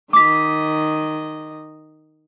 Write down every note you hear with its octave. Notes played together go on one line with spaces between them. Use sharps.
D#3 D#5 D6 B6